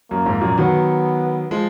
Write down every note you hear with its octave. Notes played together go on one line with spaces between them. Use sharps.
F#2 A#3
F2 G#2
F#2 A#2
D#3 F#3 B3
F3 G#3